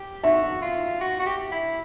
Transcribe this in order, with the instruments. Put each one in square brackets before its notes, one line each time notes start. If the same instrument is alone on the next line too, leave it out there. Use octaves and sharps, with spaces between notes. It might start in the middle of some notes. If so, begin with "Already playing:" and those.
Already playing: [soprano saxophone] G4
[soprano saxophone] F#4 [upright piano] E5
[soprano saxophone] F4
F#4
F#4
G4
E4